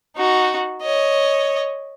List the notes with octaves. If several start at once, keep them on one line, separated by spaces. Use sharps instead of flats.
D#4 F#4
C#5 D#5